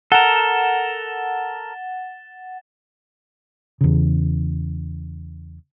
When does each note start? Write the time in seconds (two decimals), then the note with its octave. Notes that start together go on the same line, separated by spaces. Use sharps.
0.12 A4 A#4 F#5 A6 E7 G7
3.81 E2 C#3